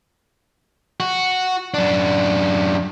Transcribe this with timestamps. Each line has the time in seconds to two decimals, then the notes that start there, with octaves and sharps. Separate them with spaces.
1.00 F#4
1.74 F#2 D4